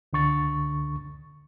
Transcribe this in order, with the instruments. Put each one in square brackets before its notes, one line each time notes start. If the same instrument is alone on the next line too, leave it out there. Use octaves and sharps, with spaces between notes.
[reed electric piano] C#2 D3 C#6 A6